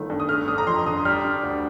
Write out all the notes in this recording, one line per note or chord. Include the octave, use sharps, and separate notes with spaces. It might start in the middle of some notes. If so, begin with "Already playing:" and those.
Already playing: G1 D#3 A3
G2
D#6
A3 F6
D4 D#6
A#5
F2 C6
D3 D#6
G3 F6
D4
D2